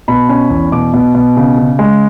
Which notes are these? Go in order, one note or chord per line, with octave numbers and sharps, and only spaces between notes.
B2 B5
C#4
E2
B2 D6
B2
B2
C#3
C#3
G#3